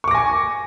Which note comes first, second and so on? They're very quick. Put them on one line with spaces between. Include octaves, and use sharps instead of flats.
C#6 D6 A#6 G#5